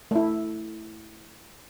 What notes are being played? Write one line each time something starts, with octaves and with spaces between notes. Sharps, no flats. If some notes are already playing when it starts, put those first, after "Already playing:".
A3 E4